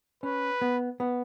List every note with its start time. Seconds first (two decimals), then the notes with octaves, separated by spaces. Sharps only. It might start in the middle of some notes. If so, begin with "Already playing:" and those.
0.23 C#4 B4
0.62 B3
1.00 B3